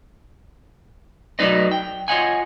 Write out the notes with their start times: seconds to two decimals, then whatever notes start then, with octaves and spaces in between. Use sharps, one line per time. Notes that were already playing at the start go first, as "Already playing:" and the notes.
1.39 F#3 A3 D#4 B4 D5 D#5
1.72 G5
2.08 F4 C#5 D#5 F#5 G#5